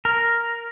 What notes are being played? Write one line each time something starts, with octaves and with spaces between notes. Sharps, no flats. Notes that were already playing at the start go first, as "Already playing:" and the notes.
A#4